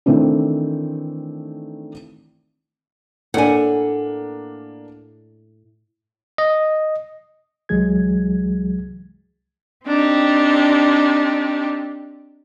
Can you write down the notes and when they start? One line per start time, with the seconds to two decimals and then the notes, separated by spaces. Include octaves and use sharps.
0.06 D#3 E3 A3 C4 D4
3.34 A2 A#3 D4 F#5 G#5
6.38 D#5
7.69 C2 E3 F#3 G#3 G#4 G#6
9.86 C4 D4 D#4 G4